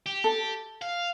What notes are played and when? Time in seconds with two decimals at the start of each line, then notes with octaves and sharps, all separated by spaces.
0.06 G4
0.24 A4
0.82 F5